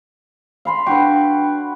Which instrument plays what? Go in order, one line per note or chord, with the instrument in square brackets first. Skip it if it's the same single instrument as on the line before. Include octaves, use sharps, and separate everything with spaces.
[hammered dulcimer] F5 B5 C6
[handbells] D4 G5 [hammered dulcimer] F#4 B4